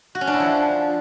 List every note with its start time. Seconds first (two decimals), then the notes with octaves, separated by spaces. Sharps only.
0.15 F#4
0.21 C#4
0.27 D4
0.34 E4
0.40 F3